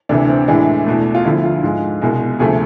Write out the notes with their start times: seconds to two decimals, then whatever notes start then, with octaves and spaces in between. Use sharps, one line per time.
0.09 D2 C3 E3 D4
0.29 C4
0.48 A2 E3 G#3 D4
0.86 E2 B2 A3
1.15 F4
1.24 D2 D3 F3 E4
1.44 F4
1.63 G#2 G#3
2.01 C2 B2 G#3
2.39 D2 C3 F3 A3 G#4